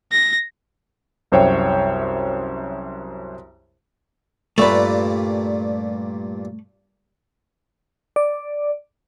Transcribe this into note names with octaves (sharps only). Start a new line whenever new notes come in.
A#6
C2 F#2 C5 C#5 E5 G5
G2 A#2 G3 A3 B4
D5